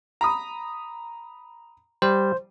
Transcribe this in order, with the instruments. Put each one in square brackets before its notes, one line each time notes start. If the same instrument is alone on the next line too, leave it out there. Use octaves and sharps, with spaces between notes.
[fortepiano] A#5 B5 D#6
[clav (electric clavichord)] G3 [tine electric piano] C5